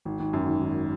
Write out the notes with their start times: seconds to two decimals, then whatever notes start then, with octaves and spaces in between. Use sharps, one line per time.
0.05 G#1
0.20 G#1
0.33 F#2
0.48 D#3
0.61 G#1